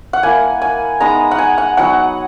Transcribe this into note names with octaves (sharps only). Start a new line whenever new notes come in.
F#5
A#3 E4 G#5
G#5
G#3 B3 D#4 A#5
F#5
G#5
F#5
F#3 B3 D#4 F#5